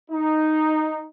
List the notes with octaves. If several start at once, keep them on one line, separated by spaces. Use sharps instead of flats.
D#4